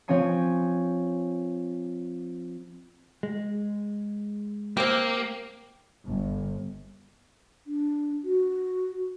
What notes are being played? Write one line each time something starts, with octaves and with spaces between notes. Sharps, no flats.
F3 C4 C#5 G#5 C7
G#3
A#3 C4 G4
G1
D4
F#4